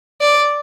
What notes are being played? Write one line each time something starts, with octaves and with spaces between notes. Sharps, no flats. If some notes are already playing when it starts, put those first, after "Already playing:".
D5